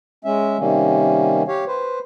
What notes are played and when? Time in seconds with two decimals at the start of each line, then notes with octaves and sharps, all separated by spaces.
0.25 G#3 C#4 E5
0.58 C3 D#3 G3 A#3 C#4
1.48 G4 C#5 F5
1.67 B4 C5